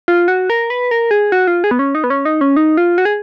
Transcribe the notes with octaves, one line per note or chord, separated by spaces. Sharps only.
F4
F#4
A#4
B4
A#4
G#4
F#4
F4
G#4
B3
C#4
D#4
B3
C#4
D#4
C#4
D#4
F4
F#4
G#4